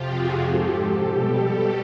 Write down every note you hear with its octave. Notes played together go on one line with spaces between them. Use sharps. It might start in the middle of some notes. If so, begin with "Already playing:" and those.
Already playing: F2 C3 F3 F4 G4
F#4 G#4
G#2 F3 G4 A4
B2 G3